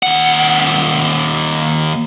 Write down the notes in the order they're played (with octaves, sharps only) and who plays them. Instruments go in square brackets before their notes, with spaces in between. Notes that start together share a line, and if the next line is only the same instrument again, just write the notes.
[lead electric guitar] D#2 F#5